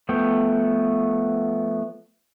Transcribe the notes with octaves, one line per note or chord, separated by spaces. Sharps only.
F3 A3 B3 G5